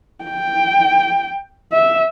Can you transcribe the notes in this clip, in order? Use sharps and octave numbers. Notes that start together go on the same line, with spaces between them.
G5
E5